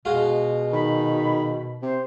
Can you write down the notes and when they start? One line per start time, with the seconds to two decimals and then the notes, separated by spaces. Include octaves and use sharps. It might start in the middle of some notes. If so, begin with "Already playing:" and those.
0.05 B2 G#3 F4 F#4
0.73 D#3 B5
1.82 C3 C5